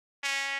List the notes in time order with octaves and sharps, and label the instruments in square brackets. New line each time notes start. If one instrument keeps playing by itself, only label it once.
[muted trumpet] C#4